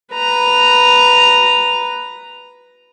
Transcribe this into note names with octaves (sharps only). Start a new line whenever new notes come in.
B4 A#5